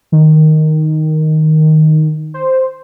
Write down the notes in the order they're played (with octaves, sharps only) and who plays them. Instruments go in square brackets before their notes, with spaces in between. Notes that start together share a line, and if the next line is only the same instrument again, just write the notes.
[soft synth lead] D#3
C5